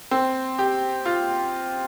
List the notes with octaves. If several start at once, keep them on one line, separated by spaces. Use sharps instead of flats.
C4
G4
F4